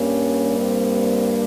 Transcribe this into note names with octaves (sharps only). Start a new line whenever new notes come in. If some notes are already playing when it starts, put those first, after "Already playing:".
Already playing: G2 G3 A#3 C#4
C4